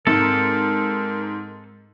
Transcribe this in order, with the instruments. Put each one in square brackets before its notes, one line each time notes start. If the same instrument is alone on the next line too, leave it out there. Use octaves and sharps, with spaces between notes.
[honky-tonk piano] G#2 [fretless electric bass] G#3 C4 [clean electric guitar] A4 [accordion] A#4